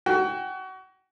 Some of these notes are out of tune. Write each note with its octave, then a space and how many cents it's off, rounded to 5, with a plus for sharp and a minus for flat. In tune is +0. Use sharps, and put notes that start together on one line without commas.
F#4 +30 G5 +30